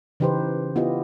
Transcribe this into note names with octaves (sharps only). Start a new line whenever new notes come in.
C#3 E3 D#4 G4 B4 C5
B3 E4 F4 G4 D#5